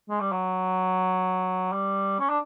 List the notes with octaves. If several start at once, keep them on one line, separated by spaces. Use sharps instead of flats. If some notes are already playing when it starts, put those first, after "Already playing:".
G#3
G3
F#3
G3
C#4
D4